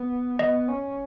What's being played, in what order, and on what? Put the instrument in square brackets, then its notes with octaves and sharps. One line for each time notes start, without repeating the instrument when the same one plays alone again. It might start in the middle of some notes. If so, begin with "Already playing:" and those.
Already playing: [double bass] B3
[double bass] B3 [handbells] D#5
[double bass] C#4